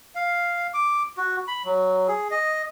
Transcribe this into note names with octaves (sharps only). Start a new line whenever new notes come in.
F5
D6
F#4
B5
F#3
G#4
D#5